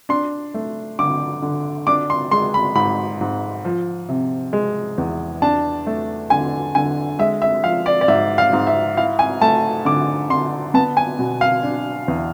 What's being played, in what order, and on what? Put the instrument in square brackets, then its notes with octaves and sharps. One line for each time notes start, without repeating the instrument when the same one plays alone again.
[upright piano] D4 C6
A3
D3 D6
D3
D4 D6
C6
G#3 C6
B5
G#2 B5
G#2
F3
C3
G#3
E2
D4 A5
A3
D3 G#5
D3 G#5
G#3 E5
E5
F3 F5
D5
D5
G#2 E5
F5
G#2
E5
E4 F5
G#5
A3 A5
D3 D6
D3 C6
B3 A5
G#5
B2
F5
D4
E2